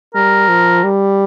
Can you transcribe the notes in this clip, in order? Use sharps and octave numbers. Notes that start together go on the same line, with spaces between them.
G3 A#4
F3
G3